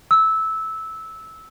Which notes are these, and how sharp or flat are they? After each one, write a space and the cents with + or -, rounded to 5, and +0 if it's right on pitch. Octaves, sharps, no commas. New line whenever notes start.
E6 -15